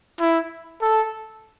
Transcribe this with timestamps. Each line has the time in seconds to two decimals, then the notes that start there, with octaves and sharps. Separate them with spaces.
0.20 E4
0.82 A4